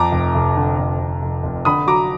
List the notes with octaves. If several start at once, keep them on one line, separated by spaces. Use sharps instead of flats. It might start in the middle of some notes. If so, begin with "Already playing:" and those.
Already playing: F2 A#5 D6
F1
F1
D3
F2
F1
F1
F1
D3 B5 D#6
F#3 A#5 D6